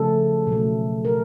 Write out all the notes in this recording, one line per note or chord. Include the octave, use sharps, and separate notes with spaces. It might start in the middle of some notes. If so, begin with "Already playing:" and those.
Already playing: C#3 F3 A3 A4
B2 F#3 A3
A#4